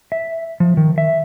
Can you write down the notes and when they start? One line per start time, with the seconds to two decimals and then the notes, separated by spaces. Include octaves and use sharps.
0.12 E5
0.60 F3
0.77 D#3
0.98 E5